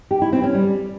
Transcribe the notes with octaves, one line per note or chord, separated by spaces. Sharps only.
G4
E4
C4
C#4
G3